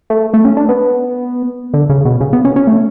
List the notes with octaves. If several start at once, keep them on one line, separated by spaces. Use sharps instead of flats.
A3
A3
C#4
D4
B3
D3
C#3
B2
C#3
B3
C#4
C#4
A3